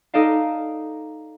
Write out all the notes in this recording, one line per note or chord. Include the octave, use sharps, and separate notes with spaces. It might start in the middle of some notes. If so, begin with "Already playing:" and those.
D#4 A4 D5 D#5 F5